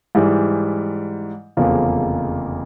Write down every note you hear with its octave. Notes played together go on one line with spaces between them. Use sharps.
G#2 E3 G3
F1 E2 C#3 F3 A#3